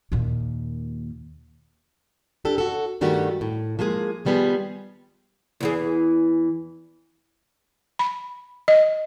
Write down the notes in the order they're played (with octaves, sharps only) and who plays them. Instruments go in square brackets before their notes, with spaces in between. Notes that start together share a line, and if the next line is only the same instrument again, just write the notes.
[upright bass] D#2 A#2
[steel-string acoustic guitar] D4 G4 A4
F#4 A4
G2 D#3 G3 A3 F#4 G4
A2
F3 G#3 A#3 G#4
D#3 F3 G3 B3 G#4
[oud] E2 E3 G#4
[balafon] B5
D#5